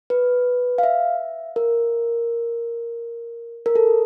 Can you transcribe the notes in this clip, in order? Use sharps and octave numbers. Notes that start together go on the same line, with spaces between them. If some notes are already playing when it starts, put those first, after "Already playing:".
B4
F5
E5
A#4
A#4
A4